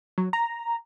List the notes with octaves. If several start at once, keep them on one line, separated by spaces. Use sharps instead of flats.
F#3
A#5